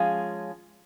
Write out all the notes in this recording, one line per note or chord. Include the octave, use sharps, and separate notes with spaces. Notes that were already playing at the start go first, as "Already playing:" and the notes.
Already playing: F3 G#3 C#4 F4 G#4